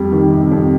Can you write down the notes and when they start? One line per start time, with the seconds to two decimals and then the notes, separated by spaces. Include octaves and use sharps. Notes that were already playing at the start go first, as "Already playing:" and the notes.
Already playing: F2 G3
0.12 D#3
0.32 C3
0.52 F2